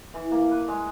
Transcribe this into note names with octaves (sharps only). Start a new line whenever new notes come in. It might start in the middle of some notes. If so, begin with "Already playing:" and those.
E3
A#3
B4
G#3